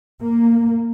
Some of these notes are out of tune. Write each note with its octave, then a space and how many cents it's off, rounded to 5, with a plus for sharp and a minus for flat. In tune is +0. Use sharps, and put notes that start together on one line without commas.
A#3 -5